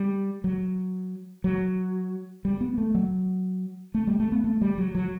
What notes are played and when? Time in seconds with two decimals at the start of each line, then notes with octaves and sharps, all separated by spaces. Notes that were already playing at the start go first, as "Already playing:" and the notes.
Already playing: G3
0.44 F#3
1.44 F#3
2.45 G3
2.61 B3
2.78 A3
2.95 F#3
3.94 A3
4.07 G3
4.20 A3
4.32 B3
4.44 A3
4.61 G3
4.78 F#3
4.95 F#3